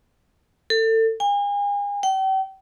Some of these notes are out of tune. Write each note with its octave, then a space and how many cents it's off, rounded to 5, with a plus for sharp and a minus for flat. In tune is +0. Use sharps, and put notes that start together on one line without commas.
A4 +30
G#5 -40
G5 -40